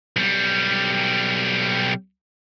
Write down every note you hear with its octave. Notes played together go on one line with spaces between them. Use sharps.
B1 G3